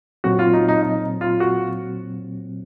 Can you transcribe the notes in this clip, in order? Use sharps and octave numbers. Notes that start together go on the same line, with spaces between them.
A#2 F#3 C4 F#4
F4
D#4
D#4
D#4
F4
F#4